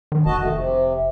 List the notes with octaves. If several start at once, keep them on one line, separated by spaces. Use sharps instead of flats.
D#3
F1 F#4 D#5 A5
D#3 A3
C3